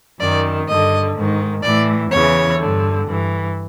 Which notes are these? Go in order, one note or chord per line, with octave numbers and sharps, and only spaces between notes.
F#2 D#3 D5
G2 D3 D#5
G#2 D#3
A2 E3 D5
E2 C#3 E3 C#5
G2 D3
G2 E3